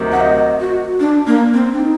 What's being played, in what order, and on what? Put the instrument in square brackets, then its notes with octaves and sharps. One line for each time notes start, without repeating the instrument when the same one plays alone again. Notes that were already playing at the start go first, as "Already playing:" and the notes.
Already playing: [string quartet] D2 C3 D#3 F#3
[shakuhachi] F#5
D#5
F#4
D4
A#3
C4
D4
D#4